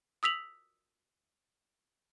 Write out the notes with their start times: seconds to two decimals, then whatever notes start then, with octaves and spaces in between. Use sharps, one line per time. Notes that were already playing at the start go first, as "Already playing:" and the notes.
0.23 D#6 E6 B6 F7 F#7